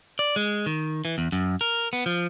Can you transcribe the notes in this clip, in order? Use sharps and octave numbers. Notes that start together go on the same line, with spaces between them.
D5
G#3
D#3
E3
E2
F#2
A#4
B3
F3